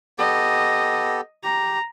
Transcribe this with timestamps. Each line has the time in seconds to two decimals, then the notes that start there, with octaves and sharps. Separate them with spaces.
0.19 B3 G4 A4 D#5
1.43 G4 A#5